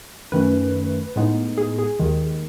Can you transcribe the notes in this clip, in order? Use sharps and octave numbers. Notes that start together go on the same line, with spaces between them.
F#2 D#3 A3 C#4 B4
A2 G#3 B3 D#4
G#4
G#4
D#2 D#3 G#3